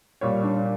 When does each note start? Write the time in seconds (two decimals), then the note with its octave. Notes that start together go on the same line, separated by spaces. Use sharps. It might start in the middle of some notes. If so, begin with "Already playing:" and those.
0.21 A#2 G3 C#5
0.44 D4